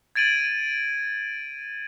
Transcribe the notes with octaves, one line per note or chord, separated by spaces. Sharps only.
G#6 A6 D7 D#7 F#7